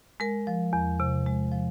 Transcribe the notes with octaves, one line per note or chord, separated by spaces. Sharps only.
G#3 A#4
F3
E2
C3
G#3
F3